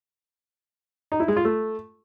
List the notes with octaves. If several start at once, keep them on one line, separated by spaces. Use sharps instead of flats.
D#4
E4
G#3
F4
A3